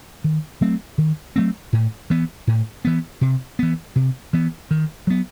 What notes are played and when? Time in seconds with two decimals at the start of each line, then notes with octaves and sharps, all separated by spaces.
0.24 D#3
0.61 F#3 A3 C4
0.98 D#3
1.36 F#3 A3 C4
1.73 A2
2.10 E3 B3
2.47 A2
2.85 E3 B3
3.21 C3
3.59 E3 B3
3.96 C3
4.33 E3 B3
4.71 D#3
5.07 F#3 B3